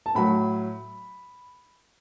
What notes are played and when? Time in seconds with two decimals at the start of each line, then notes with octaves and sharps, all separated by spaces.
0.06 A5
0.15 A2 F#3 B5